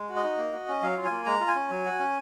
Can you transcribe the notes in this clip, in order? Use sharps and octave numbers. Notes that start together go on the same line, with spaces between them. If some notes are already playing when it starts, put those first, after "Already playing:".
Already playing: G#3
F#4
D#5
D#4
A#3
F#4
C#4
F#3 F5
F4
G#5
A#3
G#3 A#5
F4
G#5
C#4
F#3
F#4
C#4